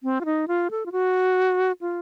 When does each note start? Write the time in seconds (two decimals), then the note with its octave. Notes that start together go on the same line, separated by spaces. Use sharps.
0.03 C4
0.21 F4
0.25 D#4
0.48 F4
0.71 A4
0.86 F4
0.92 F#4
1.81 F4